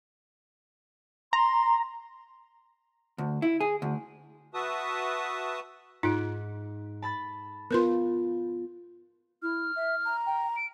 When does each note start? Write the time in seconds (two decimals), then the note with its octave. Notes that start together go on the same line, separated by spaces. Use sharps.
1.33 A#5 C6
3.18 D2
3.42 E4
3.60 G#4
3.82 D2
4.54 F#4 B4 E5 A5 D#6
6.03 G#2 D#4 F4 F#6 D7
7.02 A5 B5 A6
7.71 B3 F4 A#4 B4 C6
9.42 E4 F6
9.76 E5
10.05 A#5
10.27 G5
10.56 D7